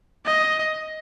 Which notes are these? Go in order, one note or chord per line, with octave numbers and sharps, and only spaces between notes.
D#5